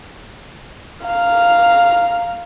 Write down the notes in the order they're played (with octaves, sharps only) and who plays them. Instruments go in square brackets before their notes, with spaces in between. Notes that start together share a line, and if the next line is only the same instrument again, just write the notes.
[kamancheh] F5 A#5